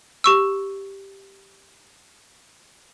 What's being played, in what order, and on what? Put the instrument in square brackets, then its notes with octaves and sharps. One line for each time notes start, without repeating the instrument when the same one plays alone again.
[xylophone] G4 C#6 E6